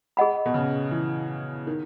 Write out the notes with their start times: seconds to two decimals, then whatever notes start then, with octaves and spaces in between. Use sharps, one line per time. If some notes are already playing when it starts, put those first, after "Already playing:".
0.17 G#4 D#5 F#5 B5
0.46 B2
0.54 C#3
0.91 E3
1.67 D#3